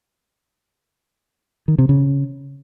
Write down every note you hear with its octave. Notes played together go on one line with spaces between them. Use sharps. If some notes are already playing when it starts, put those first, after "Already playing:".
D#3
C3
C#3